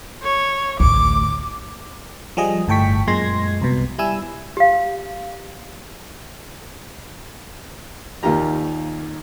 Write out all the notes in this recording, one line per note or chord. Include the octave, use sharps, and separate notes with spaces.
C#5
A1 D2 D6
F3 G3 G#4 D#5
G1 A2 A4 G5 C#6 B6
F#2 A#2 G#3 C6 G#6 A#6
C2 B2
G3 E4 G#5 E6
G4 F5
D#2 A#2 D#3 F4 G4 A#5